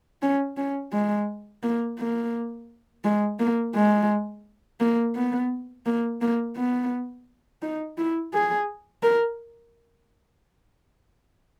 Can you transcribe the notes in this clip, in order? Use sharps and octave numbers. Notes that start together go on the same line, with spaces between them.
C#4
C#4
G#3
A#3
A#3
G#3
A#3
G#3
A#3
B3
A#3
A#3
B3
D#4
E4
G#4
A#4